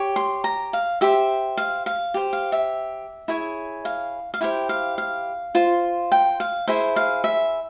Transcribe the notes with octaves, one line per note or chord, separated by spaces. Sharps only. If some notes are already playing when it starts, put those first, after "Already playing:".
Already playing: G4 C#5
C6
A#5
F5
G4 C5 E5
F5
F5
G4 C5
F5
E5
E4 G#4 C#5
F5
F5
E4 G4 C5 G5
F5
F5
F4 C5
G5
F5
E4 G#4 C5 E5
F5
E5